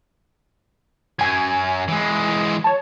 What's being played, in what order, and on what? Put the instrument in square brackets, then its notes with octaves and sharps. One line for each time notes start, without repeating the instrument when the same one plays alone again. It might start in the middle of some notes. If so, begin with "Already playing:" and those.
[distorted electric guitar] F#2 [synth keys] G#5 G#6
[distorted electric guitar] E3 G#3
[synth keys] C#5 A5